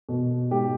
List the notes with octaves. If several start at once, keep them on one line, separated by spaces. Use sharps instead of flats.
B2
G#2 G4